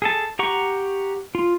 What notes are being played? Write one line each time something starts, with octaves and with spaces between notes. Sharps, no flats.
G#4 A4 A5
G4 F#5 A#5 C#6
F4